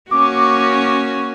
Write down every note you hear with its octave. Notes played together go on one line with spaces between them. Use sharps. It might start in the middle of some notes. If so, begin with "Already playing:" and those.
A#3 C#4 F#4 D6